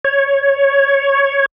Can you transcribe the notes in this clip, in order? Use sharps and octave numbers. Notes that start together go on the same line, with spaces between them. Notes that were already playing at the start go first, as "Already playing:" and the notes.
C#5